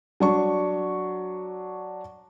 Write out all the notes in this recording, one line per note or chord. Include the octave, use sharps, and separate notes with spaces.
F#3 D4 C#6